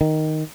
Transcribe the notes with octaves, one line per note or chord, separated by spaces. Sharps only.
D#3